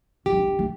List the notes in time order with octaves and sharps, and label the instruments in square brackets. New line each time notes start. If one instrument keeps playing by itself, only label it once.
[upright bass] C#4 [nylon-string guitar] G4
[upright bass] D4
C#4
B3
A3